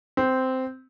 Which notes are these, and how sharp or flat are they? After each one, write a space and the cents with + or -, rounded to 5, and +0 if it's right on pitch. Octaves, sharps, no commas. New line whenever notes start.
C4 -10